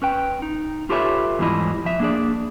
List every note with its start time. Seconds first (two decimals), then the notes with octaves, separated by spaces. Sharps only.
0.02 C#4 B4 G5
0.42 D#4
0.90 F4 G4 A4 B4 C#5 E5
1.39 E2 G#2 F3 G3 E4 D#5
1.85 F3 E5
2.00 A#3 D4 G#4 D5